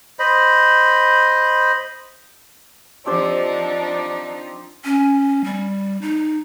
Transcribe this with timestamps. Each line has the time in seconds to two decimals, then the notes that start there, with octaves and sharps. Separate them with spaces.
0.19 C5 D#5 B5
3.06 F3 C4 D4 D#4 G4 C5
4.84 C#4
5.44 G3
6.02 D#4